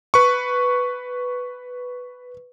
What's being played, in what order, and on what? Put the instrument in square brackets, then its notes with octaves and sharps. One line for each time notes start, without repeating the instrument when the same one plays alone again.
[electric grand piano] B4 C#6